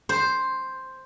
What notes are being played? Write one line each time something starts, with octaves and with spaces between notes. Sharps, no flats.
C5